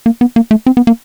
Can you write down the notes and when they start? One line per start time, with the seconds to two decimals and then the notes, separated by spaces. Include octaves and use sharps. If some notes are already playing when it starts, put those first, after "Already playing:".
0.06 A#3
0.21 B3
0.36 A#3
0.51 A3
0.67 C4
0.77 B3
0.87 A#3